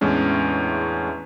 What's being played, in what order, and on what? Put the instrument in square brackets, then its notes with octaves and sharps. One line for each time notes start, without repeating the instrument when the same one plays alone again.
[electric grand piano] E2 A2 G#3 C#4 D4